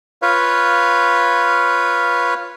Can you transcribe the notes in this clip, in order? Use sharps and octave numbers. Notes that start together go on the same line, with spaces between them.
F4 B4 C#5 F5